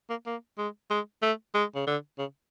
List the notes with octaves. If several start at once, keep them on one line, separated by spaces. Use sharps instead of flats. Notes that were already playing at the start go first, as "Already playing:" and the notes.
A#3
A#3
G#3
G#3
A3
G#3
C#3
D3
C#3